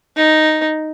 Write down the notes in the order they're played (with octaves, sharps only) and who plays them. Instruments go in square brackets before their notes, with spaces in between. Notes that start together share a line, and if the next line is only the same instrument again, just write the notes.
[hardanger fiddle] D#4